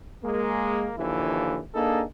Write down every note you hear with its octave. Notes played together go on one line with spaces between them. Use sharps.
G#3 A#3
D#2 D3 E3 F3 E4
A#3 D4 D#4 G#4 A4